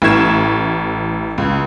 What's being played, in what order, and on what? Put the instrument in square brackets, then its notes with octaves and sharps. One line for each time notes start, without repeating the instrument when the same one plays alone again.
[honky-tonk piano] A1 A3 E4 C#6 G#6 E7
C#2